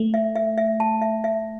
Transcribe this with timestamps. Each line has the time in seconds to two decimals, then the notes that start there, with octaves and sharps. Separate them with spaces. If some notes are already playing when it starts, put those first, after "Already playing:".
Already playing: A3
0.14 E5
0.36 E5
0.58 E5
0.80 A5
1.02 E5
1.24 E5